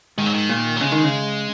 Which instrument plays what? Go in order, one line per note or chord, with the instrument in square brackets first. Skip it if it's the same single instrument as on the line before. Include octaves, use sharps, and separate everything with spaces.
[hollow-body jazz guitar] G#2 [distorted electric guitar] D#3
[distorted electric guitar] F#3
D#3
[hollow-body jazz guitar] A#2
[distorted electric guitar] F#3
[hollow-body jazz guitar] C#3 [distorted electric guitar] G#3
[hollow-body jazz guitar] D#3
C#3